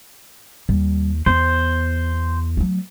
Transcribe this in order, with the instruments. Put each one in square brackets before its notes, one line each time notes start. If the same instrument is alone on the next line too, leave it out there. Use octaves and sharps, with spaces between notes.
[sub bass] D#2 [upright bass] G3
[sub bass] E2 [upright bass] B3 [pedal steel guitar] C5
[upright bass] F#3 A3